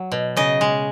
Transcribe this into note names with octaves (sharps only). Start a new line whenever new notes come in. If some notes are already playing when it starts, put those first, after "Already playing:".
Already playing: F#3
B2
C#3 D#5
G#3